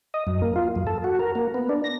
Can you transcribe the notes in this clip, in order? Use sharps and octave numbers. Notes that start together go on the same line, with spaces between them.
D#5
F#2
A#3
F4
F#2
A4
F#4
A#4
A#3
B3
D4
A#6